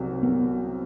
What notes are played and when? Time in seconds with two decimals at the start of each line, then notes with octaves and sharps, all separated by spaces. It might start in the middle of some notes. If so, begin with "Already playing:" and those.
Already playing: C2 C3 F#3
0.23 B3